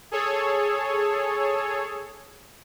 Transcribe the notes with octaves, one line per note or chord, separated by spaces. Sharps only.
G#4 A4 C#5